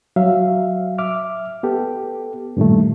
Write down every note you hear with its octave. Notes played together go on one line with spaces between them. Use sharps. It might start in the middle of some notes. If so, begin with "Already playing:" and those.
F#3 E5 F5
E5 D6 F6
B3 G4 A4
G2 A#2 D#3 A3